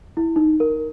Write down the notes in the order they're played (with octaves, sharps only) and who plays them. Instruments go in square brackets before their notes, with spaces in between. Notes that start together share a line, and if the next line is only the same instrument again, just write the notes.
[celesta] E4
D#4
A#4